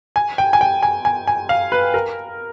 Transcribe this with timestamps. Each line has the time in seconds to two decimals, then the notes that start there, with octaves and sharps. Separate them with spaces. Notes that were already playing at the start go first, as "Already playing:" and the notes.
0.16 G#5
0.38 G5
0.53 G#5
0.61 G5
0.83 G#5
1.05 G#5
1.28 G#5
1.49 F5
1.72 B4
1.94 A#4